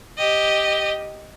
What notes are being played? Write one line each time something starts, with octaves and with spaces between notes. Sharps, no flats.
G4 D#5